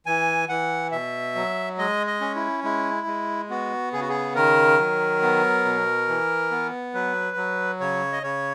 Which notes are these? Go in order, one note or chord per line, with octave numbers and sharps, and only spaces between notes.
E3 G#5
E3 F#5
B2 E5
F#3
G#3 D#5
D#5
C#4
E4
G#3 E4
G#3
B3 F#4
C#3 G#4
F#4
G#4
D#3 A#4
F#3
B3
B2
E3
B3
F#3 B4
F#3
C#3 C#5
D#5
C#3 C#5